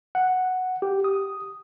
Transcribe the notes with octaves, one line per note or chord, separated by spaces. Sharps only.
F#5
G4
D#6